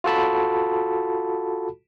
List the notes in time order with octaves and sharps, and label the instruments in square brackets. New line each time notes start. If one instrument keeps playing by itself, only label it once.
[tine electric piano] F4 F#4 A4 A5 B5